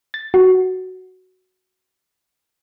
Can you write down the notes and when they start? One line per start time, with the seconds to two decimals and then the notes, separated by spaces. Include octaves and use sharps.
0.14 A6
0.34 F#4